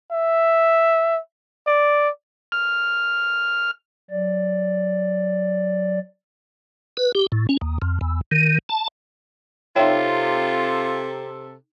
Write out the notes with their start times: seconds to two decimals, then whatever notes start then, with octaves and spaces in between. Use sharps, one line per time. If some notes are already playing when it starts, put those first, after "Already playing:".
0.12 E5
1.67 D5
2.52 F6
4.11 F#3 D5
6.97 B4
7.15 G4
7.32 A2
7.49 C#4
7.61 D#2
7.82 F2
8.01 E2
8.32 D#3
8.69 A5
9.76 C3 D#4 F4 A4 C#5 E5 G5